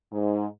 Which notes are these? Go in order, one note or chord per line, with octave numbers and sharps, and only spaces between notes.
G#2